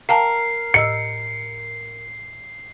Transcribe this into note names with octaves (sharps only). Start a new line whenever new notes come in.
A#4 F5 G5 A5 C7
A2 D#5 E6 C#7